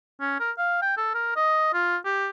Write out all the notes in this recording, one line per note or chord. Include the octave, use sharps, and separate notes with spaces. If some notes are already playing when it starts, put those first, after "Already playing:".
C#4
A#4
F5
G5
A4
A#4
D#5
F4
G4